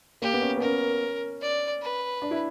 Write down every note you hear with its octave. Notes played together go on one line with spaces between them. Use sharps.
A#3 G4
B3
C#4
B3
C#4 A#4
D5
B4
D4
E4